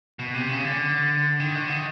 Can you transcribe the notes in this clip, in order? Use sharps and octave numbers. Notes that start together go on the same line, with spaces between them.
B2
C3
C#3
D3
D#3
D3
D#3